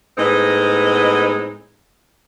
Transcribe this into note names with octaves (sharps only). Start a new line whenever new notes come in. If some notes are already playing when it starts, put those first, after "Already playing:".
A2 G#3 B3 C4 D#4 D#5